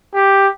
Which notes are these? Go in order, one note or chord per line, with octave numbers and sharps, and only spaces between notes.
G4